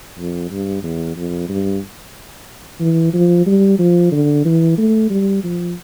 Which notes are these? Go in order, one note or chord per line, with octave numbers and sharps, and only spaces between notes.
F2
G2
E2
F2
G2
E3
F3
G3
F3
D3
E3
A3
G3
F3